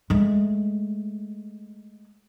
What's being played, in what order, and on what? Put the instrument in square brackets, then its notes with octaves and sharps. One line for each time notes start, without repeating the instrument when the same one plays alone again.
[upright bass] G#3 A3